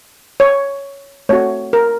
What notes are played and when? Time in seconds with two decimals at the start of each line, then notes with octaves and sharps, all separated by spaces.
0.40 C#5
1.29 A3 C4 F#4 C#5
1.73 A#4